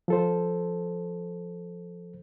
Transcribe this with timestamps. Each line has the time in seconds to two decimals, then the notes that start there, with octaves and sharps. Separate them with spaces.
0.08 F3 A4 C5